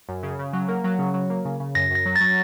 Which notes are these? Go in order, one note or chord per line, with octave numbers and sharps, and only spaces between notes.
F#2
C#3
C#3
F#3
A#3
F#3
C#3
F#3
A#3
C#3
C#3
F#2 A#6
F#2 A#6
F#3
A6
F#3